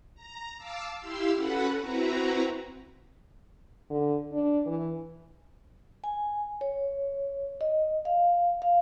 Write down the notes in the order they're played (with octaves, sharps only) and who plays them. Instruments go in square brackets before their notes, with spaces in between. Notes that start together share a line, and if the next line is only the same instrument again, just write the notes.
[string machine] A#5
F5 A5 D6 E6
E4 G4 F5 C6 E6
C#4 F#4 A4 B4 F#5 B5
C4 E4 F#4 B4 A#5
[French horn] D3
D4
E3
[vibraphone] G#5
C#5
D#5
F5
F5